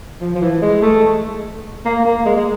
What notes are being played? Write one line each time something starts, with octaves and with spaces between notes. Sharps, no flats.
F3
F3
E3
G#3
A3
A#3
A#3
G#3
G#3